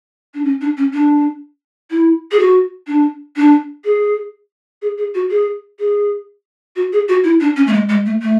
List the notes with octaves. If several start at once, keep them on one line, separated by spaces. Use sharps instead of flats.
D4
C#4
D4
C#4
D4
E4
G#4
F#4
D4
D4
G#4
G#4
G#4
F#4
G#4
G#4
F#4
G#4
F#4
E4
D4
C#4
A3
G#3
G#3
A3
A3